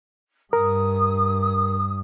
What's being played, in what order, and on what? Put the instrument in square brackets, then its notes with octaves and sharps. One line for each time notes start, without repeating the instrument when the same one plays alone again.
[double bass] G2 [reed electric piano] A#4 [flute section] D#6